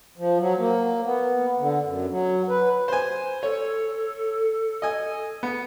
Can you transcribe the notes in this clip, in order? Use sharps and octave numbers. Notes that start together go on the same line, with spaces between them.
F3
F#3
A#3
B3
D3
F#2
F#3
B4
C5 G#5
A4 C#5
D#5 G#5
B3